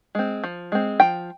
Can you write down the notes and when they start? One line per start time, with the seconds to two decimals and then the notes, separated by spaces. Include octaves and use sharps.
0.15 G#3 C4
0.44 F3
0.72 G#3 C4
1.00 F3 G5